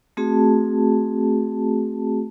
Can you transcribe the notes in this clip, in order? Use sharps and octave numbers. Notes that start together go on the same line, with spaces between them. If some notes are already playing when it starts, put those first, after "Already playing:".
A3 C4 F#4 G#4 A5